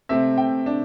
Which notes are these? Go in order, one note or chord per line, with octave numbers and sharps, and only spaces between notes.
C3 A3 C4 E5
G5
D4